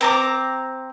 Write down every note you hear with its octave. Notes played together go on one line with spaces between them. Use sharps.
C4 A#5 D6